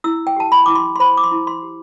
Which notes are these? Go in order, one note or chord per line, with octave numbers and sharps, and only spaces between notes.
E4 E6
G5
G4 A5
B5
E4 D6
C6
C6
C5 B5
D6
C6
E4
C6
G4